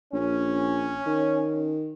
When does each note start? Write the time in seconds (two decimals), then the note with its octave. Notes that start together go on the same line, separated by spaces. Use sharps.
0.13 A#1 C#4
1.06 D#3